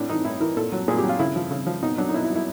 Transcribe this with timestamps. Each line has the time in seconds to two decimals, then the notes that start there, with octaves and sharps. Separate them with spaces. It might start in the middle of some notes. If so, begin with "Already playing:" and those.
Already playing: A2 D4
0.10 E3 D#4
0.25 A2 E4
0.40 E3 A#4
0.57 A#2 A4
0.72 F#3
0.88 A#2 G#4
0.98 G4
1.04 F#3
1.09 F4
1.19 C#3 E4
1.36 F3
1.51 C#3
1.67 F3
1.83 B2 D#4
1.98 F#3 D4
2.09 D#4
2.14 B2 E4
2.24 E4
2.30 F#3
2.36 E4